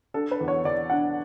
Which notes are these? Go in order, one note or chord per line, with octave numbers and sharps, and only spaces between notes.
D4 A4
B4
E2
C#5
E2 D5
D4 F#5